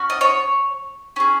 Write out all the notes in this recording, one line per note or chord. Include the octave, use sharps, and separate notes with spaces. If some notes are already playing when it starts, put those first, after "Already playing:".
Already playing: C#4 F#4
D#5
C#5
C#4 G#4